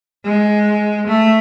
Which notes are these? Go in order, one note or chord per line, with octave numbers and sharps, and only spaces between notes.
G#3
A3